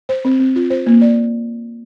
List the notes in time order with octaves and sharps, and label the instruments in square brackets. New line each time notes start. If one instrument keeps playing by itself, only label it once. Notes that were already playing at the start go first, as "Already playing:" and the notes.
[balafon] C5
C4
C4
F4
C5
A#3
D5